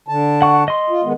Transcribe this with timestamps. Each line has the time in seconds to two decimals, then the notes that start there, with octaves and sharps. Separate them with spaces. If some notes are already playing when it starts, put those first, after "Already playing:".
0.08 D3 A5
0.42 F#5 C#6
0.68 D#5 C6
0.90 F4
1.04 D#3 G#3 B3